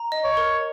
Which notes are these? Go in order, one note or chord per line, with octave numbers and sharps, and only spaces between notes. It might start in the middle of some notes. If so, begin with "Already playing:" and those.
Already playing: A#5
D#5
C#5
A#4